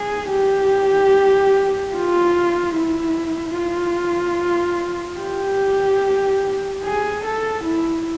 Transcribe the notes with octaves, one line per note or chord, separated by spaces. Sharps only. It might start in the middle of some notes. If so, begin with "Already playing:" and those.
Already playing: G#4
G4
F4
E4
F4
G4
G#4
A4
E4